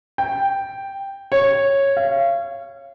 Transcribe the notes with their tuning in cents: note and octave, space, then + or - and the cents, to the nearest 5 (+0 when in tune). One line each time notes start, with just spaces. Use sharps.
G5 +0
C#5 -10
F5 -35